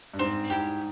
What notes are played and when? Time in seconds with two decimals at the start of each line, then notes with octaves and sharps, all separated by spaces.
0.14 G2
0.19 G#2 C4
0.50 G#2 E4 G4